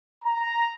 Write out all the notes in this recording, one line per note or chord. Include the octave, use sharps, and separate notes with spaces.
A#5